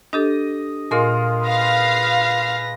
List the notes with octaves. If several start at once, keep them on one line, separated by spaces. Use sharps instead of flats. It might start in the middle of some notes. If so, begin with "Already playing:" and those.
D4 G4 A4 D#5
A#2 G#3 F4 A#4
B4 F5 A#6